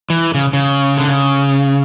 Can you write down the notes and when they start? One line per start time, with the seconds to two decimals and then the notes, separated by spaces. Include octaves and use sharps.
0.10 E3
0.35 C#3
0.53 C#3
0.97 D3
1.07 C#3